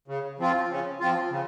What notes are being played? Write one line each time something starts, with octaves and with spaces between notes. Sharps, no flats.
C#3
F3 C4 F4
C#3
F3 C4 F4
C#3